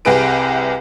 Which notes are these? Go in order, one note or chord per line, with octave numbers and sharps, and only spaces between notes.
C2 C3 G#4 B4 D7